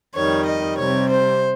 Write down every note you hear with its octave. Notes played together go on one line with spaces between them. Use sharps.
F2 D#3 G3 C#5
D#5
C3 G3 C4 C#5
C5